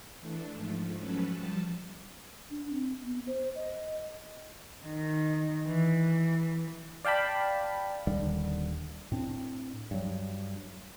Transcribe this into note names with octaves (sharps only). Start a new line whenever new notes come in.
E3 A3 D4
G#2 F3 A3
F#3 C#4 A4 B4
F3 G3 A5
D4
C4
B3
C5
D#5
D#3
E3
D5 F5 G5 A5 B5
D#1 D#2 D3 G3
A2 C4 D4
G2 F#3